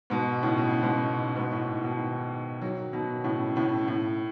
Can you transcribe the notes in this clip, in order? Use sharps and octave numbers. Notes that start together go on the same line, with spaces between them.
G#2 B2
A2 C#3
B2
C#3
G#2 B2
G#2 B2
A2
B2 D#3
D#3 F#3
B2 D#3
A2 C#3
A2 C#3
A2